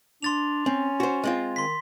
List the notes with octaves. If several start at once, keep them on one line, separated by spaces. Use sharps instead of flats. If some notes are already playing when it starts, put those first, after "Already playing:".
D4 C6 A6 F7
C4 C#4
F#4 C5
G#3 C4 F4
D#3 C6 B6